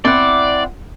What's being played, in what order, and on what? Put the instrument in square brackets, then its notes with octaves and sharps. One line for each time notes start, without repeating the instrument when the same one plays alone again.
[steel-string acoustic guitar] C4 E4 F#5 [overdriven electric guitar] D5